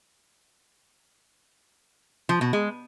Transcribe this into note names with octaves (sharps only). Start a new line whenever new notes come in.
F3
B2
G#3